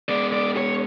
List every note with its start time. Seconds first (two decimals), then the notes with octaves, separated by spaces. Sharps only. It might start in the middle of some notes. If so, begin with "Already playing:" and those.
0.09 G#3 B3 D5
0.33 D5
0.57 C#5